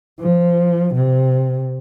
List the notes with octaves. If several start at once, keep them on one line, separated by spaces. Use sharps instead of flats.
F3
C3